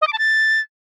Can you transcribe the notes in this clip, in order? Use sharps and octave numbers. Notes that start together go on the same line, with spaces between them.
D#5
D6
A5
A6